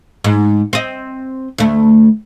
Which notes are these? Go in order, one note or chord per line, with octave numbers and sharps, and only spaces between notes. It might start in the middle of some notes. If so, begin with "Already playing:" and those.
G#2
C4 D#5
D2 A3